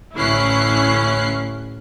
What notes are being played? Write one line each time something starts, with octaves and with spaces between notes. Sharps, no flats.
A1 D2 C#4 E4 F#6 C7